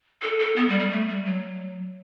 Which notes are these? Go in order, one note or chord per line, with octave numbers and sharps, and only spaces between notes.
A4
A4
B3
G3
G3
A3
G3
F#3